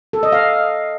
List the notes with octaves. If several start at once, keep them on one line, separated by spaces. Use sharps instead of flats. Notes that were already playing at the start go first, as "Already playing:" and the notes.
A4
D#5
F5